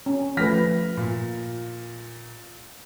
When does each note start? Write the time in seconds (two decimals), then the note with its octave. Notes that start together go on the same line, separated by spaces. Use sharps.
0.06 C#4
0.37 F3 A3 B4 F6 A#6 B6
0.97 A#2